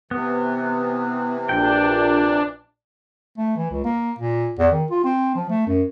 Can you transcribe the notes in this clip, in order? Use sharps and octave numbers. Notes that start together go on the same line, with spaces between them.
C3 E3 B3
A#1 D4 G5
A3
E3
C#2
A#3
A#2
E2
D#3
F4
C4
F3
A3
F#2